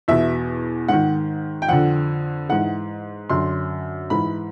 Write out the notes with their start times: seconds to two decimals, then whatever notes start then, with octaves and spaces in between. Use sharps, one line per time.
0.08 E2 B2 E5
0.88 G#2 D#3 F#5
1.62 G5
1.69 F2 D3 F#5
2.49 G#2 E3 F#5
3.29 F#2 D3 C6
4.10 G#2 E3 B5